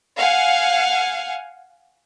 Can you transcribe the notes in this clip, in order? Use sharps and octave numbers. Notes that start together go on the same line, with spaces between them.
F5 F#5 G#5